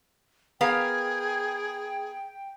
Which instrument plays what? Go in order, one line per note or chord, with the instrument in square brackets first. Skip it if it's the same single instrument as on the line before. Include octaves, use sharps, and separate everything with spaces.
[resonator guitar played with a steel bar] B3 A#4 F5 [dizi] G#4 [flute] G5